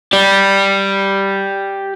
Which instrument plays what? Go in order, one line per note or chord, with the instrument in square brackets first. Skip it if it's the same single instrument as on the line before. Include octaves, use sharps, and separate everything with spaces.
[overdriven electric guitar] G4 D5